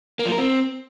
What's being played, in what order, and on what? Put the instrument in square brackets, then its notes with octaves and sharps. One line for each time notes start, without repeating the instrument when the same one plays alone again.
[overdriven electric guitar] A#3
F3
A#4
C4